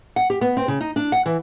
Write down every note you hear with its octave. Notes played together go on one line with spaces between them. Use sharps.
F#5
G4
B3
C4
C#3
D#4
D4
F#5
E3